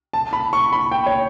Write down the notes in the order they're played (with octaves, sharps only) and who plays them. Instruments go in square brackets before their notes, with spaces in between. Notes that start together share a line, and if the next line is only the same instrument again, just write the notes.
[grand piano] A5
B5
C#6
B5
G5
C#5